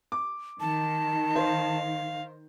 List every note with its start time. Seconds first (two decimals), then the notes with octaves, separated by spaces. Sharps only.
0.12 D6
0.60 D#3 A5
1.36 C5 F5